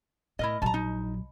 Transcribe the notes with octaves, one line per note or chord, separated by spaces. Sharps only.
A2 E4 A#4 D#5
A#1 F#3 A5 A#5
D#4